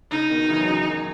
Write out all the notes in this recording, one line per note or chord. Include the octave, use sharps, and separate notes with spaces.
C#3 D#4
B2 D#3
C#3 E3
F#3
C#3 E3
D#3 F#3